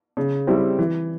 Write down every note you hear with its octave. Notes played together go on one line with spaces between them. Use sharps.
C#3
G3 C4 E4
E3